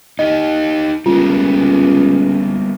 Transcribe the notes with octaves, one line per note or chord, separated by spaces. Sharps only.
D#4 G4 D#5
C#2 G3 A#3 B3 F4